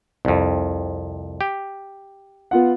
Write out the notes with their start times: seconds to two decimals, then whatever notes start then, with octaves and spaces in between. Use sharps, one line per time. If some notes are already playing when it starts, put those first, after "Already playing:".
0.25 C2 F2
1.41 G4
2.51 B3 F4 F#5